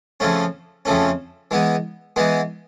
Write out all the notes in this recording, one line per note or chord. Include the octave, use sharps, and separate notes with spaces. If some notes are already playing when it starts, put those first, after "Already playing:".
F2 C#3 F3 A3 C#4
F2 C#3 F3 A3 C#4
E3 G#3 B3
E3 G#3 B3